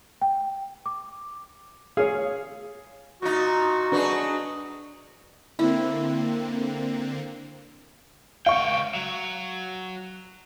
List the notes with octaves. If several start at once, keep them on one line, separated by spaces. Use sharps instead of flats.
G5
D6
G#4 C#5 F5
A#2 D#4 F#4
F#3 D4 D#4 G#4 B4
D3 A#3 C4 E4
C#2 F5 G5 C#6
F#3